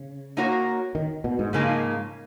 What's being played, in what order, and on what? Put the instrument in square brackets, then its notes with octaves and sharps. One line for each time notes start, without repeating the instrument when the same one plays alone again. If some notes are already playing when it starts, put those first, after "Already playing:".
Already playing: [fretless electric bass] C#3
[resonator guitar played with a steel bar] A#3 D#4 F#4 A#4 C#5
[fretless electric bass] D#3
B2
G#2
[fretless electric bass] G#2 [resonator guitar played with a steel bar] C#3 F3 A#3 D#4 G#4